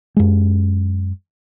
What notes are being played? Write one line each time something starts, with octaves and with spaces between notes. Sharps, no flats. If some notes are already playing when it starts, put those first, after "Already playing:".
F#2 G#3